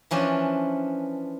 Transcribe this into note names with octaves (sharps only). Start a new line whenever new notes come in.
E3 F3 C#4 D4